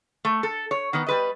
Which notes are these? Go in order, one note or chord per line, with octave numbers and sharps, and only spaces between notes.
A3
A4
C#5
D#3 B3
G3 B4 D#5